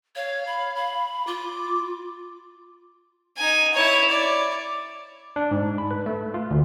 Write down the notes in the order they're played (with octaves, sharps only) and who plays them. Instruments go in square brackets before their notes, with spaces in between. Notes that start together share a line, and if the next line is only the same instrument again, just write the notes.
[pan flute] C#5 [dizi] F5
[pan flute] B5
B5
[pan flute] F4 [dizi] D6
[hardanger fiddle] D#4 G#5
E4 C#5
D5
[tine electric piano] D4
G#2
B5
B4
A3
F4
D2